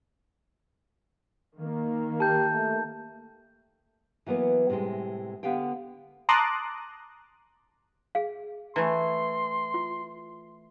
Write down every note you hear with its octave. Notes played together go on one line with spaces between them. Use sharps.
D#3 A#3
G4 A5 G6
A3
E3 F#3 A#3 B3 B4
A2 C3 G3 G#3
D3 B3 G4 F5 G5
A5 A#5 C6 D6 D#6 F#6
G#4 F5
E3 A3 A#5 C6
F4